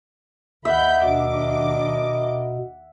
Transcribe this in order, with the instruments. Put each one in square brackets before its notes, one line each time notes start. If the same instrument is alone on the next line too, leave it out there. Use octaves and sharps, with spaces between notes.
[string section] D#2 B5 G6 [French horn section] E4 A#4 D#5 [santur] E5 F#5
[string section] D#2 D4 D6 [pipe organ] B2